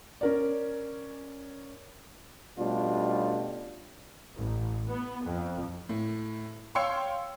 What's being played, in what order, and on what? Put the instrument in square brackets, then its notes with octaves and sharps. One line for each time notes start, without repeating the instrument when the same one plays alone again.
[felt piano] C#4 A#4 D5
[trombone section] B2 G3 A3 C#4 D4 F4
[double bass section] A1
B3
F2
[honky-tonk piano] A2
C#5 F5 G5 C6 E6 C#7